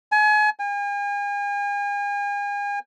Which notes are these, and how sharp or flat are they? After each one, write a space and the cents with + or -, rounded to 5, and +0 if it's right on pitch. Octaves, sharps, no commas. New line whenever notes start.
G#5 +35
G#5 -40